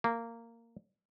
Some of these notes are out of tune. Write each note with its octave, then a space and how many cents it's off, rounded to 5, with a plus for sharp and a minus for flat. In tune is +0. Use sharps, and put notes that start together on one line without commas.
A#3 -15